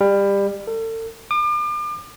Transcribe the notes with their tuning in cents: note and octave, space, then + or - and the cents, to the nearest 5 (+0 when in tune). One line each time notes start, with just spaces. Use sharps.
G3 +25
A4 +40
D6 +40